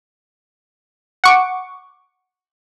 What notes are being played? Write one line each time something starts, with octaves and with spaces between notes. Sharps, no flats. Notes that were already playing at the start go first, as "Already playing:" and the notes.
F#5 C#6 D6